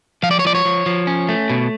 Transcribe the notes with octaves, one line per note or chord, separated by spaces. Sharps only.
F3 F5
D5
C#5
F3 D5
C#5
F3
F3
C#4
A3
B2